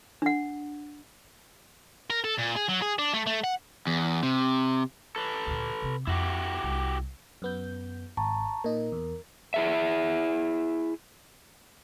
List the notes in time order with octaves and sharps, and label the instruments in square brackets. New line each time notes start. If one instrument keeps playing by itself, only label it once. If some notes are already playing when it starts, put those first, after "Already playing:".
[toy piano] D4 F#5
[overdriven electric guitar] A#4
A4
A#2
G#4
F#3
G#4
D4
A3
A3
F#5
E2
C3
[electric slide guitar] A4 B4
[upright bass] D2 A#2
C3 C4
[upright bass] F2 [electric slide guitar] E4 F#4 G4
[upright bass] C2
[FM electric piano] F#2 B3 G6
[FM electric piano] G#1 [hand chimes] A5 A#5 C#6
[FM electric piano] A#2 D#4 [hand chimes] A#4
[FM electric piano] E2
[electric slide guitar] E4 G#4 E5